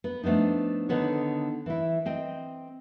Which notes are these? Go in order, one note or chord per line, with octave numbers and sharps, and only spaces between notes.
B3
F3 A3 B3 D4 D#4
D3 D#3 B3 D#4 C#5
E3 E4
C4 D#5 G5